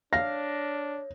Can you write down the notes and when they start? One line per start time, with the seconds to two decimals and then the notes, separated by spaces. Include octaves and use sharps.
0.13 D4 C#5 F5 A#6